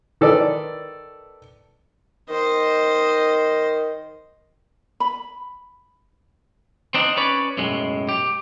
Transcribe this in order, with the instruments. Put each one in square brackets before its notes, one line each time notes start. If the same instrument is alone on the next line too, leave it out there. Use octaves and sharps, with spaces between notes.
[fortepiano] D#3 A4 B4 D5
[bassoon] D#3 [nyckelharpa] C5 D#5
[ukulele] B5
[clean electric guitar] C4 D4 D#4
C#4 B4 C#5 D5
B1 F#2 A2 G#3
G4